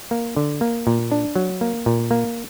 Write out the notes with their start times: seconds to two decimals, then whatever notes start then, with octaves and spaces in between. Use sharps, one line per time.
0.11 A#3
0.36 D3
0.61 A#3
0.87 A#2
1.11 D4
1.36 F#3
1.61 A#3
1.86 A#2
2.11 A#3